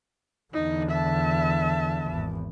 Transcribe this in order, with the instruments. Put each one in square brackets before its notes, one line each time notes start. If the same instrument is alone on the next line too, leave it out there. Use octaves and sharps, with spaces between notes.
[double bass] E2 D3 [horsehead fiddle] D#4
[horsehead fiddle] E5 A5
[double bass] G#1 E2